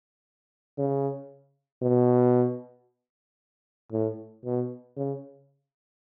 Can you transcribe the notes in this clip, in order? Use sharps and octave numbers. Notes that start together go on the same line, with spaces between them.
C#3
B2
A2
B2
C#3